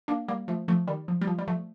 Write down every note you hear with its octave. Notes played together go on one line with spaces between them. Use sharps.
A#3 D4
G3 A#3
F3 A3
F3 A3
D#3 G3
F3
G3
F3
G3
F3 A3